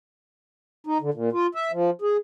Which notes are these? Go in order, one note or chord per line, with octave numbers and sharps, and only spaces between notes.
D#4
D3
A#2
F4
E5
F3
G#4